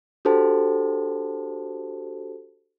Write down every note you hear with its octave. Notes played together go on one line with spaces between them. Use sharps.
D4 F#4 G4 A4 C5 A5